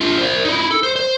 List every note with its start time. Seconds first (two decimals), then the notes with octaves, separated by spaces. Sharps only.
0.01 D4 F4
0.18 C5 D5
0.45 D#4 E4
0.71 A4
0.83 C5
0.96 C5